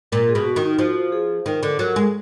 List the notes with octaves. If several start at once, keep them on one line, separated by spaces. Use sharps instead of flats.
A#2 A#4
G#4
B2
F#4
D#3
D#4
F3 F#4
G#4
D#3 A#4
D3
F#3 A#4
G#3